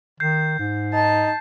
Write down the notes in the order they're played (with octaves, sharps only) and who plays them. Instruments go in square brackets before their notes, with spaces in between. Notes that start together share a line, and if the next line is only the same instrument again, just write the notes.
[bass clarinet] D#3 [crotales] G6 C7
[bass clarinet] G#2
[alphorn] D#4 [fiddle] A5